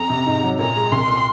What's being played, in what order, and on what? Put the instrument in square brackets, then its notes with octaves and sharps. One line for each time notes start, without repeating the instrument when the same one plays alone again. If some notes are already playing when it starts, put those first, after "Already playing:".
Already playing: [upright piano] F2 [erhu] A#5
[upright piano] C3
G#2
F#3
[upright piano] A#2 [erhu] A#5
[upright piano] G#3
[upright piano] C2 [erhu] C6
[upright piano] A#2